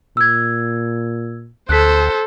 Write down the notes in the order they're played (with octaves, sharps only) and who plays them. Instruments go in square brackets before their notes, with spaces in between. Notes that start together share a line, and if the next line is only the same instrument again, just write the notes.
[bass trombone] A#2 [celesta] E6 G#6
[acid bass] D2 [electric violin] A4 C5 [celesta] F#6 B6